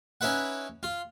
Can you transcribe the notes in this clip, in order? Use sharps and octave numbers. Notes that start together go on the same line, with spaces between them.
C#4 D#4 E4 B4 F#5
F4